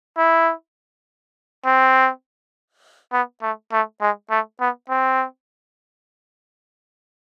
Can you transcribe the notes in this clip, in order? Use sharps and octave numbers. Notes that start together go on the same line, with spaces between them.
E4
C4
B3
A3
A3
G#3
A3
B3
C4